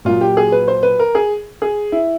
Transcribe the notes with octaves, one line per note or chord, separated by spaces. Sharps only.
A#2 F#3 F4
G4
G#4
B4
C5
B4
A#4
G#4
G#4
E4